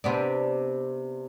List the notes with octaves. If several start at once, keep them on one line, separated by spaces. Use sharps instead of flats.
C3 B3 D4